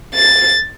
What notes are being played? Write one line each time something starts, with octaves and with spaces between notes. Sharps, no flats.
A6